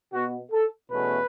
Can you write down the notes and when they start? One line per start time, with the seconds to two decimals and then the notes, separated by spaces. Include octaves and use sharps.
0.12 B2 B3 F#4
0.52 A4
0.90 E2 B2 A3 C#4 B4